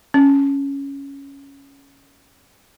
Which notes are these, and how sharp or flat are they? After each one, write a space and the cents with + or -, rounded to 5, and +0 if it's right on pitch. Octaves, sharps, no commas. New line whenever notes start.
C#4 +0